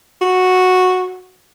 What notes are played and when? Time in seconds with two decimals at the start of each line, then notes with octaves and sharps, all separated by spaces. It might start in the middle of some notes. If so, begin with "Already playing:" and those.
0.21 F#4